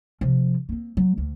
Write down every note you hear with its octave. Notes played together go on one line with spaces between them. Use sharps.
C3 F3
A#3 C4
F#3
D2